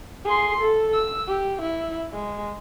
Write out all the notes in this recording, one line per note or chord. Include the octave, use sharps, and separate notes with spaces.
G#4 C6
A4
E6
G4
E4
G#3